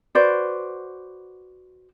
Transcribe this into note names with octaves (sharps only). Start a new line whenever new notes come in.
F#4 B4 C5 D5